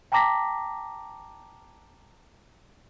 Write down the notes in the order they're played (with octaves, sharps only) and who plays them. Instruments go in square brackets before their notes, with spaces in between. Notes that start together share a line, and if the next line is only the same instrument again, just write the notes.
[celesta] G5 A5 A#5 D6 A#6 B6